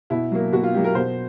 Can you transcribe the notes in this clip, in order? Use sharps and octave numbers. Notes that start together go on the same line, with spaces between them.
B2 E4
F#3 A#3
B2 F#4
F4
F#3 A#3 G4
A#4
B2 C5